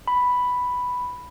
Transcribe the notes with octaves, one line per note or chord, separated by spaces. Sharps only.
B5